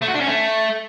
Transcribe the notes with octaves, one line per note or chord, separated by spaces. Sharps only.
A3
F#4
D4
C#4
A3